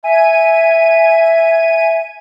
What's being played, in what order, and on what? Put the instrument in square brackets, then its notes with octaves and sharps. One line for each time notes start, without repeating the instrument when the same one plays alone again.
[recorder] E5 [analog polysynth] G#5 D#7